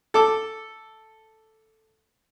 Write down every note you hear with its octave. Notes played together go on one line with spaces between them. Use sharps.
A4 D6